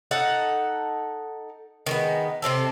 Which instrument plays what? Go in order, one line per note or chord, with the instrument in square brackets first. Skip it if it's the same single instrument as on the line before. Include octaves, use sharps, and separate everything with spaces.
[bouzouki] D#4 A4 F#5
D#3 G#3 B3
C3 C4 G4 A4